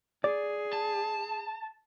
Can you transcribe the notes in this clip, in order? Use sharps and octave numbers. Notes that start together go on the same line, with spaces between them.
G#4 D5
A5